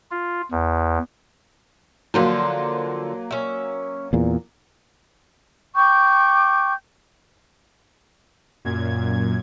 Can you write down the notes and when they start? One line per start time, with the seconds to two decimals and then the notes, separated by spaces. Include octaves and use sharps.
0.11 F4
0.51 E2
2.14 D3 F3 F#3 A#3 C5
3.31 C#4 E5
4.13 E2 A#2
5.76 G5 C#6 D6 G6
8.65 F#2 A#2 G#6